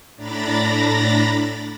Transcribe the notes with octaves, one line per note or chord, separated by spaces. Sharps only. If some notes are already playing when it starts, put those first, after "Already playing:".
A2 D4 A#5 B5 A6 A#6